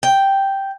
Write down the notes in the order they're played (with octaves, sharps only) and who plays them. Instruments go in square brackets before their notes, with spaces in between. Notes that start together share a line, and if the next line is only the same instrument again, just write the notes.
[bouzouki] G5